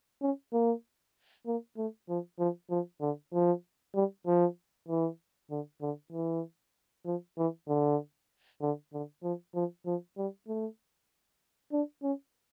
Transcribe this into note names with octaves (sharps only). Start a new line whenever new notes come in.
C#4
A#3
A#3
A3
F3
F3
F3
D3
F3
G3
F3
E3
D3
D3
E3
F3
E3
D3
D3
D3
F3
F3
F3
G3
A3
D4
C#4